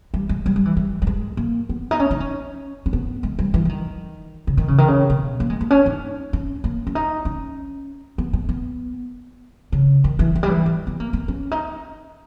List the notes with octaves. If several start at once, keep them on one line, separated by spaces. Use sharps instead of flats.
G3
G#3
G3
G3
E3
G3
G3
G#3
A#3
B3
D#4
C#4
D#4
C#4
C#4
B3
G#3
G3
E3
E3
D#3
C#3
D#3
C#3
D#3
C#3
B2
A#3
G#3
A#3
C#4
D#4
C#4
A#3
C#4
D#4
C#4
B3
G#3
B3
C#3
D#3
E3
E3
G3
E3
E3
B3
A#3
B3
C#4
D#4